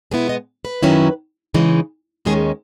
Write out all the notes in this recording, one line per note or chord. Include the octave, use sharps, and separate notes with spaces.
B2 G#3 B3 E4 G#4
D#5
B4
F#2 D#3 F#3 C#4 E4
C#3 E3 G#3 D#4
D#2 D#3 G#3 C#4 G#4